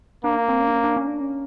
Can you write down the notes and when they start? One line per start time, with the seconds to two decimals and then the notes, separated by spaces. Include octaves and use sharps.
0.24 A#3 D4
0.49 C4
0.60 C#4
0.67 D4
0.73 C#4
0.84 D4
0.97 C#4
1.08 D4
1.21 C#4